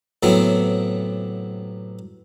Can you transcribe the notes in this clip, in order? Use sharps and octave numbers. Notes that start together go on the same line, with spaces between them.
A2 C3 F#3 B3 C4